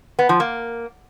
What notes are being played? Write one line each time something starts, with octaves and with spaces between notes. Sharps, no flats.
B3
F3
A#3